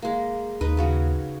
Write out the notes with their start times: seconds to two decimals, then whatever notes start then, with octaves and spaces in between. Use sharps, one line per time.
0.02 G#3 A#3
0.61 D#2 D#4 B4 D#5
0.77 C#3 C#4 F#4